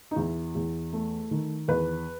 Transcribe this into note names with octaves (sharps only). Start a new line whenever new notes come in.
D#4
E2 E4
E2
A3
D#3
E2 B4